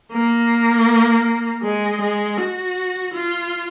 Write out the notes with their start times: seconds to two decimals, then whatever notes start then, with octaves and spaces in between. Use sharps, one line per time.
0.12 A#3
1.63 G#3
2.01 G#3
2.38 F#4
3.13 F4